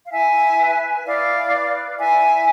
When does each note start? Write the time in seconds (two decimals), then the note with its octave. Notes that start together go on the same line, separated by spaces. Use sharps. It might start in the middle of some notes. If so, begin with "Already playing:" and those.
0.07 F5
0.12 E4 E5 G#5
0.59 B4
1.06 E4 D5 F5
1.52 B4
1.99 E4 E5 G#5